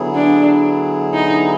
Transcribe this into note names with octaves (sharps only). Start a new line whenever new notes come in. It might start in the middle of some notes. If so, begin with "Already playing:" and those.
Already playing: D3 F#3 B3 E4 G#4
D4
D#4